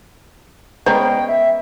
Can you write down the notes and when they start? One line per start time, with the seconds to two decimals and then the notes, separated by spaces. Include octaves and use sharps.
0.86 G#3 B3 C#4 C5 D5 G5 A#5
1.28 E5